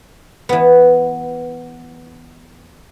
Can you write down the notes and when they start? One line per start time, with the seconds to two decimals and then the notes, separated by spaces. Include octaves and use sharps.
0.49 E3 B3